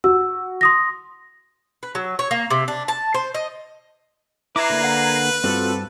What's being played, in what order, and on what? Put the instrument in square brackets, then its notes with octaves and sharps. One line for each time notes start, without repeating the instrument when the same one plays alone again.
[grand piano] F#4 [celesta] E6
[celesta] C6 D#6 A#6
[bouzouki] B4
F#3
C#5
A#3
C3
D4
A5
C5
D#5
[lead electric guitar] E4 E5 [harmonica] B4 [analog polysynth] A#5 G#6 C7 [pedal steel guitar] D6
[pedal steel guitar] D3 A#3
[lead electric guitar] F5 F#5
[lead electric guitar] G2 [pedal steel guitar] C4 F4 F#4 [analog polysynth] A4